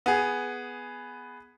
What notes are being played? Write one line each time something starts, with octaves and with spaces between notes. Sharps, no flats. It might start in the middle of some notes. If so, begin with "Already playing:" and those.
B3 G#4